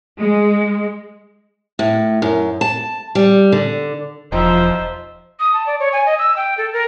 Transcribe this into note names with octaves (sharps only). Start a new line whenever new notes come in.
G#3
A2
F#2
A5
G3
D3
E1 F3 G3 D#4 C5 E5
D#6
A5
D5
C#5
G#5
D#5
E6
G5
A4
A#4